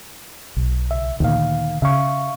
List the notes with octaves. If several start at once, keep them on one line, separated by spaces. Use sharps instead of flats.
B1
C#2 E5
D2 A#2 D#3 F5
C#3 E5 F5 C#6